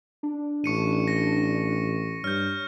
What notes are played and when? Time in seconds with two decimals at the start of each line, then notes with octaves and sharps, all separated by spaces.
0.23 D4
0.64 A1 C#6 C#7 D#7
1.08 A#6
2.24 G2 C#5 F6 G6